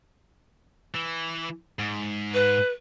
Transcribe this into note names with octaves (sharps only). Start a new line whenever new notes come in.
E3
G#2
B4